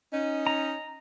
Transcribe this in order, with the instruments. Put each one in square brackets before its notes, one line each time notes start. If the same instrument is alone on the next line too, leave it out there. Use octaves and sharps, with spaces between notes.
[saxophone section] C#4 D#4
[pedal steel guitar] A#5